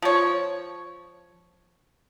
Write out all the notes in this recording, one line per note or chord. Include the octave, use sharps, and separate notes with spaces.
F3 C#5